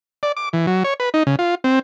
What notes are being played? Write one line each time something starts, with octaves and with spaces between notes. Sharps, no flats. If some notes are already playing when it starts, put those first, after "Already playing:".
D5
D6
E3
F#3
C#5
B4
D#4
C#3
F4
C4